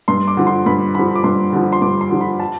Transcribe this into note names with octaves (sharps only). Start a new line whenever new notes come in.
G2 C6
D6
D3 F3
C6
G2 B5
D3 F3 B5
D6
G2 C6
D3 F3
C6
G2 D6
C6
D3 F3
B5
A5